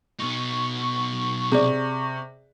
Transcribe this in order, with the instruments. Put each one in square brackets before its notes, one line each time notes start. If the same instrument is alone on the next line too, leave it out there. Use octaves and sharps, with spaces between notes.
[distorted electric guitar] B2 D#4 [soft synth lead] C#6
[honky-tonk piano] C3 [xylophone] G#4 D5